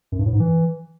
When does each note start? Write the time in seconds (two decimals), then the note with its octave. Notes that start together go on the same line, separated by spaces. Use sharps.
0.12 F#2
0.19 G2
0.26 A2
0.33 G#2
0.40 E3